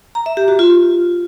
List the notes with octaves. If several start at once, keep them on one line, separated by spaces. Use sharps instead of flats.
A#5
E5
G4
F#4
F4